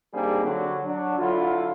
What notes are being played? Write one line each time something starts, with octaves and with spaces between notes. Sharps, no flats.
G3 A#3 C4 D4 D#4 G#4
D3 F#3
F#3 D4
D3 F#3 E4 F4